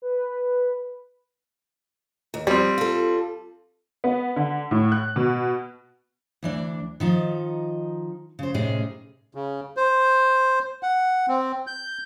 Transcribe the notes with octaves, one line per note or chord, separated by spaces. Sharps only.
B4
D#2
F3 G3 C4
F4 A4
B3
D3
A2
F#6
B2
D2 E3 D4
D#3 F3 D#4
C#3 C5
A2 C3 G#3 C#4 D#4 G#4
C#3
C5
F#5
C4
G6